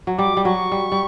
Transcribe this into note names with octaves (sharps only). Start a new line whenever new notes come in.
F#3
G3 D6
G3
F#3 C#6
G3
G3